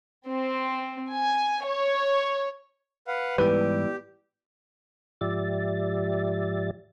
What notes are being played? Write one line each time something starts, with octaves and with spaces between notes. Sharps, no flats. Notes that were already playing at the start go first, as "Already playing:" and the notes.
C4
G#5
C#5
B4 F5 F#5
G#2 E3 G3 B3 E4 G4 B4 D5
G#2 F3 G4 D5 E5 A6